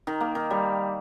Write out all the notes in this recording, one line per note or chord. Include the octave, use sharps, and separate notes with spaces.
D#3
A#3
D#3
G3